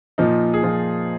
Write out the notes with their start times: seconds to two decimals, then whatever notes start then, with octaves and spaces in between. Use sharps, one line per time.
0.18 A#2 F3 D#4
0.54 G#4
0.63 A#2 F3 F4